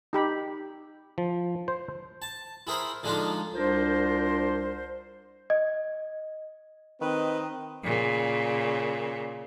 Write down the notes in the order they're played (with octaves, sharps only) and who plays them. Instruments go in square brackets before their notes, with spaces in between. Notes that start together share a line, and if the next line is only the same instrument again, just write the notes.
[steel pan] D#4 G4 B5
[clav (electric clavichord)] F3
C5
[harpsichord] A5
E4 G#4 A#4 C5 B5
D3 F3 G#3 D4 D#4 F4
[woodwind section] C2 D4 F4 A#4 C5
[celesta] D#5
[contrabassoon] D#3 [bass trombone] C4 [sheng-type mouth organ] B4 [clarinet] D#5
[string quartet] A#2 C#3